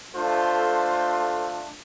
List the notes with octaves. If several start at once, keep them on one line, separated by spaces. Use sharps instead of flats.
A3 D4 F4 A4 C5